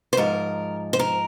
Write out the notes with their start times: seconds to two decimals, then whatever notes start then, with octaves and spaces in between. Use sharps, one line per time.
0.13 C5
0.17 G#2 F3 A#4
0.93 C5
0.99 A#4